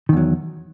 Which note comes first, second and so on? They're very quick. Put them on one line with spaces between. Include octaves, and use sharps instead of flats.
D#3 E2 F#3